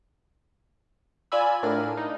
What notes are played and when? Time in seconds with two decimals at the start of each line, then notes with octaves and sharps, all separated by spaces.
1.32 F4 D5 G#5 B5 E6
1.63 A2 D4 A#4 F6 D#7
1.97 D#4